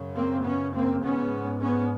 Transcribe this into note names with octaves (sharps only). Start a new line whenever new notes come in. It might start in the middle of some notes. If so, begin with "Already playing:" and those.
Already playing: F#2 C#3
A#3 C4
B3 C#4
A#3 C4
G#2 B3 C#4
B3 C#4